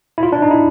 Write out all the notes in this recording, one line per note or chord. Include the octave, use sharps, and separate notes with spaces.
E4
F4
D4
D#4
E4